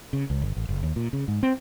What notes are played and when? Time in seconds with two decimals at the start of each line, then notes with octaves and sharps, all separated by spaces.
0.13 C#3
0.30 C#2
0.42 G1
0.57 A1
0.69 F#1
0.83 D#2
0.96 A#2
1.13 C#3
1.28 G#2
1.43 C4